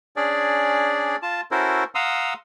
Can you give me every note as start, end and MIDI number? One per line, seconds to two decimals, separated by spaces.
0.16 1.16 61
0.16 1.16 62
0.16 1.16 68
0.16 1.16 74
1.22 1.41 65
1.22 1.41 81
1.51 1.84 61
1.51 1.84 64
1.51 1.84 66
1.51 1.84 69
1.51 1.84 70
1.51 1.84 72
1.95 2.34 77
1.95 2.34 78
1.95 2.34 82
1.95 2.34 84
1.95 2.34 87
1.95 2.34 88